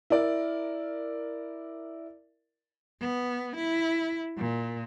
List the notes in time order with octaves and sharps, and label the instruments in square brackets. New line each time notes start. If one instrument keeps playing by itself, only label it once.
[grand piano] E4 A#4 D5
[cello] B3
E4
A#2